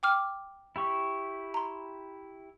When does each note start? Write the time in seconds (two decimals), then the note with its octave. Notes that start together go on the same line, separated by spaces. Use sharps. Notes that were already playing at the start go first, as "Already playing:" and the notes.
0.03 G5 D6 F6
0.76 E4 G4 C#6
1.54 A#5 C6